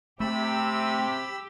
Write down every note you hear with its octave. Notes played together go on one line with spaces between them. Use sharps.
C3 A3 G4 B5 E6